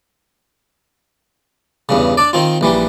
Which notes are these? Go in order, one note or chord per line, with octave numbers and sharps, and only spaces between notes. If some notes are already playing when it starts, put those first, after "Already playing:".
E2 G2 C#3
D4 D5
D#3 C4 F4
A#1 E3 G3